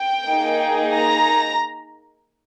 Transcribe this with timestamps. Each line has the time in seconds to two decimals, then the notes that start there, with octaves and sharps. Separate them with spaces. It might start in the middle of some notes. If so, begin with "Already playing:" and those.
Already playing: G5
0.27 A#3 D#4 G#4
0.93 A#5